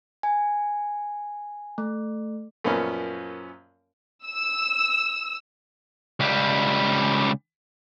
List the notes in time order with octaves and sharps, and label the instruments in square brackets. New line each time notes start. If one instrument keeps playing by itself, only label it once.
[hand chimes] G#5
A3
[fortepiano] F#2 A#2 F3 B3 C#4
[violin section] E6
[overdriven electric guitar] C#2 G3